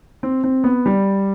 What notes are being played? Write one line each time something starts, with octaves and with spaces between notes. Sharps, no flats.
C4
C4
B3
G3